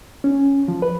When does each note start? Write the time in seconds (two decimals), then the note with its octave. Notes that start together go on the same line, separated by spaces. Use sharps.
0.24 C#4
0.68 F3
0.82 B4